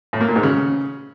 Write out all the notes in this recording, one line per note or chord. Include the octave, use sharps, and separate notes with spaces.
A2
A#3
A#2
G#2
C#3